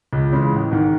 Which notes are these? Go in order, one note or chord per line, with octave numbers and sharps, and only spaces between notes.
C#2
C#3 E3 G#3
A1
G#2 D#3